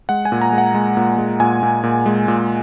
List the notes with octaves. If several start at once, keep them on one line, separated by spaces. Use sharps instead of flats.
G#3 F#5
G#5
A#2
A#5
G#3
F#5
G#3
A#2
G#3
A#2 G#5
A#2
A#2
G#3
A#2